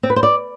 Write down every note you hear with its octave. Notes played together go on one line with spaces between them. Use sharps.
C4
B4
C5
D5